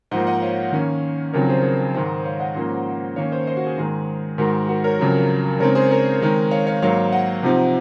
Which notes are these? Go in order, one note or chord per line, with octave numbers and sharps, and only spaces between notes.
G#2 F3 A#3 D#5 F#5
D#5 F#5
C#5 F5
D#3 A#3 C#4
F2 C#3 F#3 C4 D#4 A#4 C#5
G#4 C5
G#4
G#2 D#3 G#3 D#4 G#4 C5
C#5 F5
D#5 F#5
G#2 F3 A#3 C#4
D#3 A#3 C#4 C#5 F5
C5 D#5
C5 D#5
F#4
G#4
G#2 D#3 G#3 D#4 G#4
G#2 D#3 G#3 F#4 A#4
F#4 A#4
A#4 C#5
F2 C#3 F#3
C#3 G#3 C4 D#4 A#4 C#5
G#4 C5
A#4 C#5
D#3 G#3 C4 D#4
C#5 F5
C#5 F5
G#2 F#3 A#3 C#5 F5
D#5 F#5
C3 F3 C4 D#4